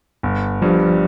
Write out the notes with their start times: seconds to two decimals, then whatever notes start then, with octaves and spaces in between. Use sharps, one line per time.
0.23 G1
0.62 G2 F3 G3